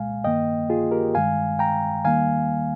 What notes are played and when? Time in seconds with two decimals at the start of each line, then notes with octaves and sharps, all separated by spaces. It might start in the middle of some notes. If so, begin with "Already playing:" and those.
Already playing: C2 A#2 G#3 F5 G#5
0.24 G2 D#3 A#3 D#5 G5
0.70 F4 G#4
0.91 G4 A#4
1.15 G2 D#3 G#3 F5 G#5
1.59 G5 A#5
2.04 D#2 D#3 G3 A#3 F5 G#5